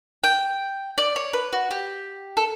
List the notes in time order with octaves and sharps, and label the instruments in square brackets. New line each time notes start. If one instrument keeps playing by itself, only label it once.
[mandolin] G5
D5
C#5
B4
F#4
G4
A4